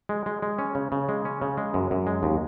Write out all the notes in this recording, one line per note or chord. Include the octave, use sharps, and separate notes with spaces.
G#3
G#3
G#3
C#4
C#3
C#3
G#3
C#4
C#3
G#3
F#2
F#2
G#3
D#2